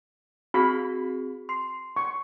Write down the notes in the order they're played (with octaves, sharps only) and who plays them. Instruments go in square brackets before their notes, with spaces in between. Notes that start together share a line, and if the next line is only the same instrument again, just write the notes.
[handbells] C4 F#4 G#4 [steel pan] B5
[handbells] C6 C7
[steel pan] C#6